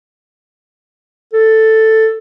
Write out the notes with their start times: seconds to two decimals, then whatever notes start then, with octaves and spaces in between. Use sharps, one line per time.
1.33 A4